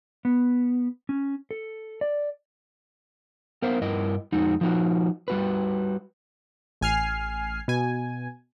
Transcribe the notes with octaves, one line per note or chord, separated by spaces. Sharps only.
B3
C#4
A4
D5
B3 A#4 C5 E5 F5
G2 E4 A#4 D#5
F2 G#3 D#4 F#4
F3 D#4 F#4
G3 F#4 B4
A1 G#5 F6 C7
B2 G#5